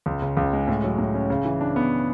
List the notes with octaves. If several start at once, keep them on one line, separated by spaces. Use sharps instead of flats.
C#2
C#3
C#2
G#3
A2
F#3
A2
C#4
C#3
E3
D4
B3